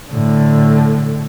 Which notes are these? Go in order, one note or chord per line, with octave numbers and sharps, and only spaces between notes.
A2 D3